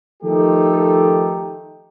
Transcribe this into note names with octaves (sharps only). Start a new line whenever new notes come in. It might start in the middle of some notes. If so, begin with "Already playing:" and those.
D#3 F3 A3 D#4 G4 A4